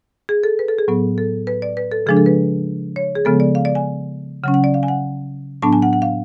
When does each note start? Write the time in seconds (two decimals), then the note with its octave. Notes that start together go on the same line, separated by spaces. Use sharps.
0.29 G#4
0.44 A4
0.59 B4
0.68 A4
0.79 G#4
0.88 A2 F#3 B3
1.18 A4
1.47 B4
1.62 D5
1.77 B4
1.92 A4
2.06 C#3 F3 G#3 D4 G#4
2.17 A4
2.26 B4
2.96 C#5
3.15 G#4
3.25 C#3 F3 G#3 B3 A4
3.40 D5
3.55 F5
3.65 D5
3.75 G#5
4.44 C#3 F#3 C#4 F#5
4.54 F#5
4.64 D5
4.74 F5
4.83 G#5
4.88 F#5
5.62 A2 F#3 B3 D4 A5
5.73 G#5
5.82 F#5
5.93 F#5
6.02 F5